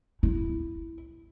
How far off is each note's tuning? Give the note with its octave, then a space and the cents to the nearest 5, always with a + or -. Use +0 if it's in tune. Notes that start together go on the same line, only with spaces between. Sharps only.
E4 +0